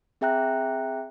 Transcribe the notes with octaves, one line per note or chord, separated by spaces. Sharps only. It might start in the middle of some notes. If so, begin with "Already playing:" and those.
C4 G#4 E5 G5 A#5 F#6